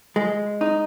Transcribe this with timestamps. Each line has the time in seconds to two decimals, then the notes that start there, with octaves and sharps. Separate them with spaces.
0.16 G#3
0.61 D#4